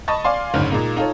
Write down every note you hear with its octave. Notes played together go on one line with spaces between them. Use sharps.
D#5 A5 B5 C#6 A6
D5 F5 G#5 C6
F#1 D2 G#2 C#4 F6
A#2 G#3 A#3 D#4
D#4 F4 A4 C#5